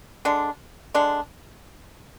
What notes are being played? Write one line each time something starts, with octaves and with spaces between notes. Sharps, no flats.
D3 G#3 D4
D3 G#3 D4